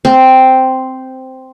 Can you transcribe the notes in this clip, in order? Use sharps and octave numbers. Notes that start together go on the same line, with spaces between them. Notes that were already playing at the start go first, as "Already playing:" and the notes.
C4